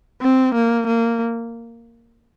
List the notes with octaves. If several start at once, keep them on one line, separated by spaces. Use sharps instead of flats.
C4
A#3
A#3